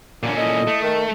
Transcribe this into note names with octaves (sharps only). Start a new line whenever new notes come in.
A#2 D3 A#3 C#4
E4 A4 D#5
A3
D#3